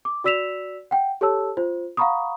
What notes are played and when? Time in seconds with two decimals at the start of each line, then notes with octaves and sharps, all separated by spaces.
0.05 D6
0.24 F#4 D5 E6 B6 E7 F7
0.91 F#5 G5
1.21 G4 A4 C#5 A5 E6
1.57 F4 C5
1.97 F5 F#5 A#5 B5 C#6 D#6